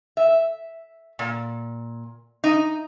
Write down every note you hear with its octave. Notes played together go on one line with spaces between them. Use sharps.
E5
A#2
D#4